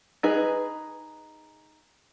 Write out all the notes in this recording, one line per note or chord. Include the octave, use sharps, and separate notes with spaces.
D#4 G#4 B4